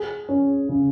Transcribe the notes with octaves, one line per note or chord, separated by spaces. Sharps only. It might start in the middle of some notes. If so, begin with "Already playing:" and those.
Already playing: G#4
C#4
C#3